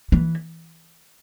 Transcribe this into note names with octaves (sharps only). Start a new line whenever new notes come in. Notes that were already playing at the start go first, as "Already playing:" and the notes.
E3